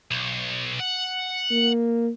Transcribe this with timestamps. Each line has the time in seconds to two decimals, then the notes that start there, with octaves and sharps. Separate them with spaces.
0.11 B1
0.80 F#5
1.51 A#3